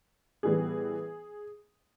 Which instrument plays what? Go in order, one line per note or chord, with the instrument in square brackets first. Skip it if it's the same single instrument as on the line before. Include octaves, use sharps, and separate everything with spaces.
[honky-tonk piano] A2 E3 G3 B3 G#4